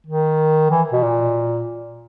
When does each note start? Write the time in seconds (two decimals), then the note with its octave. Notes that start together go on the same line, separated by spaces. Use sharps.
0.07 D#3
0.71 E3
0.92 B2
1.03 A#2